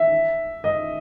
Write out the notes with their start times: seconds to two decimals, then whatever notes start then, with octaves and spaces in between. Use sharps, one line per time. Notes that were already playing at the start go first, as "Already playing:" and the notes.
Already playing: E5
0.64 D#5